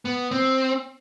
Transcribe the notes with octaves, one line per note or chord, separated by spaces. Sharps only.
B3
C4